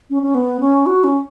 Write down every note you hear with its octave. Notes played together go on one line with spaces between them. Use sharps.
C#4
C#4
B3
C#4
F#4
C#4